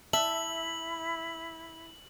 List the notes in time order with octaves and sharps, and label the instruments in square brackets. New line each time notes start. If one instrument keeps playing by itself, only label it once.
[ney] E4 [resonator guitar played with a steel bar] E5 [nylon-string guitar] A5 [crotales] F#7